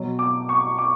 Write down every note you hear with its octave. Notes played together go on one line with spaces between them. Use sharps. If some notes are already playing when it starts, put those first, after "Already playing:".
Already playing: B2 F#3
D6
C#6
D6